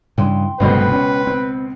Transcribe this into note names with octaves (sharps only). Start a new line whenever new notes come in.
G2 C#3 E3 G5 C6
F1 C#2 G2 B2 A3 B4 C5
C#4
C4